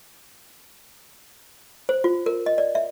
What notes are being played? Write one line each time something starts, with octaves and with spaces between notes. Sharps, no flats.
C5
F4
A#4
D#5
D5
E5